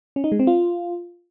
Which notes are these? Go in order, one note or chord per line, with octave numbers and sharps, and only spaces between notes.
C#4
D#4
G#3
C4
F4